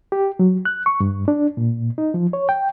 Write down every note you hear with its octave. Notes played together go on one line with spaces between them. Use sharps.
G4
F#3
F#6
C#6
G2
D4
A#2
D#4
F3
C#5
G5